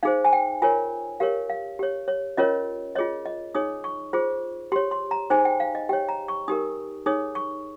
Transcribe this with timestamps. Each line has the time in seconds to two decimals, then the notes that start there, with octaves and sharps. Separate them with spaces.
0.03 D#4 G#4 C5 F5
0.25 G#5
0.33 G5
0.62 F4 A#4 C#5 G#5
1.20 G4 A#4 C#5 F5
1.50 F5
1.79 G4 C#5
2.08 C#5
2.37 C#4 F4 A#4 C#5 D#5
2.95 F4 G#4 C#5 D#5
3.25 D#5
3.55 D#4 G#4 C#5 D#6
3.84 C#6
4.13 F4 G#4 C5
4.72 G4 C#5 C6
4.91 C6
5.11 A#5
5.30 D#4 G#4 C5 G#5
5.45 G5
5.60 F5
5.75 D#5
5.89 G4 C#5 G5
6.09 A#5
6.28 C#6
6.48 D#4 G4 A#4 D#6
7.06 D#4 G#4 C#5 D#6
7.35 C#6